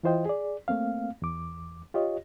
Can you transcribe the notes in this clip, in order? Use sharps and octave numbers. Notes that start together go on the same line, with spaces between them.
E3 E4 F4 C5 D#5 G5
G#4 D5
A3 A#3 C4 F5
E2 D6
F4 G4 C#5 D#5